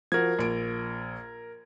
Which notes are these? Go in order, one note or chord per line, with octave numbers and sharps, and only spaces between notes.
F3 F#4 A#4 G#6
A#1 D7